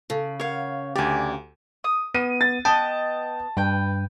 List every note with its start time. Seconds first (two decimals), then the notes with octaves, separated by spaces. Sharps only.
0.10 C#3 A4
0.40 A#4 C#5 F5 F#5
0.95 D2 G4 D5 G#5
1.84 D#6
2.14 B3 D#7
2.41 A6
2.65 B3 D#5 G5 A5
3.57 G2 B4 G5